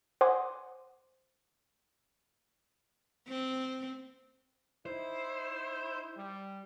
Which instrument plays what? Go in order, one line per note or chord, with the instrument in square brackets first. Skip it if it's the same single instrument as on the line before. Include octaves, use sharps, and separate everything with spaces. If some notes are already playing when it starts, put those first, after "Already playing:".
[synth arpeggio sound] C5 F#5 G#5 C6 D6 D#6
[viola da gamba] C4
[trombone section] D#4 E4 [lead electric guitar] C5
[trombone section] G3